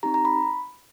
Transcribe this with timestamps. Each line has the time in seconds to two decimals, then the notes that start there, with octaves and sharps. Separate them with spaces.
0.03 C4 D#4 G4 A#5
0.14 A#5
0.25 B5